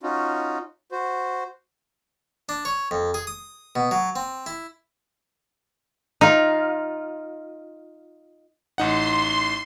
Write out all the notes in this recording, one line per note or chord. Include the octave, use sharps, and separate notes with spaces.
C#4 D#4 F4 F#4
F#4 C5
D4
C#5
F2
G#4
D#6
B2
F#3
C4
E4
D#4 F4
A1 D#4 F#5 C6